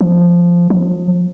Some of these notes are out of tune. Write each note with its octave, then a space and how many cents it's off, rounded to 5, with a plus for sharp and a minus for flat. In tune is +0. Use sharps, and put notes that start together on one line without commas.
F3 -5
F3 +35